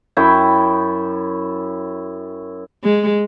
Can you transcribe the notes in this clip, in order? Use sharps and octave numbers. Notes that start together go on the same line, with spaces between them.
F#2 E4 G5 C#6
G#3